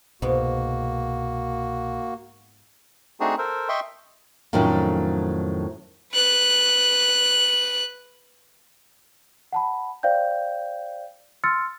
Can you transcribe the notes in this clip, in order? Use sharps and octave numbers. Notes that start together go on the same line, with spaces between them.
C2 G#2 B2 A#3 B3 F#4
A3 C4 D4 D#4 F#4 G#4
A4 A#4 C5
D#5 E5 G5 C6 C#6
F2 A2 D#3 F#3 C#4 D#4
B4 F#6
F#5 A5 B5
C5 D5 F5 G5 G6
C6 E6 F6 A6 C#7